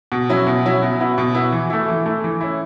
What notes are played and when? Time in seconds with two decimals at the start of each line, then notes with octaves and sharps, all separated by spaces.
0.12 B2
0.29 F#3 C#4 E4
0.47 B2
0.65 F#3 C#4 E4
0.83 B2
1.00 B3 E4
1.18 B2
1.35 B3 E4
1.52 E3
1.70 A3 E4
1.88 E3
2.06 A3 E4
2.24 E3
2.41 C#4 E4